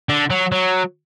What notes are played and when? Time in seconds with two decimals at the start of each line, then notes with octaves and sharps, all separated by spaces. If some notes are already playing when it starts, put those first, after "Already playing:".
0.09 D3
0.30 F#3
0.52 F#3